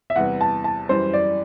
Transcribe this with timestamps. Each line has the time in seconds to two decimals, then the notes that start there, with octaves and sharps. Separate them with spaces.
0.10 E5
0.16 E2 C3 G3 B3 E4 F#5
0.41 A5
0.64 A5
0.89 F#2 E3 G3 C5
1.14 D5